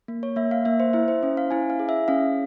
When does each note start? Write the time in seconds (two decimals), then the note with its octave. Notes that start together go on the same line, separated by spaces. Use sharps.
0.08 A#3
0.23 C#5
0.36 A#3 E5
0.51 F5
0.65 A#3 E5
0.80 C5
0.93 E4 E5
1.08 C5
1.23 C#4 C5
1.37 F5
1.51 E4 G#5
1.70 F5
1.79 G#4
1.89 E5
2.08 C#4 F5